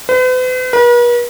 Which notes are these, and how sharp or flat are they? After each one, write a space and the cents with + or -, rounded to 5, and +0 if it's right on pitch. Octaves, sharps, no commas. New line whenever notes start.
B4 +45
B4 -45